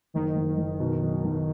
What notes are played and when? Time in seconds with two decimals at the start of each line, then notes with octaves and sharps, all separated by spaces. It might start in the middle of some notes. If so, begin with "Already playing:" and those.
0.14 F#1 D#3
0.36 F#1
0.58 F#1
0.80 B2
1.02 F#3
1.25 B1